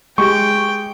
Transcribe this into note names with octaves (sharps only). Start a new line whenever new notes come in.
G#3 G4 G5 C#6